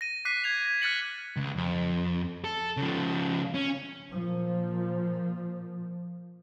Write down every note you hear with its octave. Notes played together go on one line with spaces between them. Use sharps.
A#6 D#7
D6 F#6 B6 C7 D#7
G#6 C7 F7
A#6
F6 F#6 A6 B6 C#7 F#7
C#2
F2
A4
C#3 F3
C#4
A#2 F3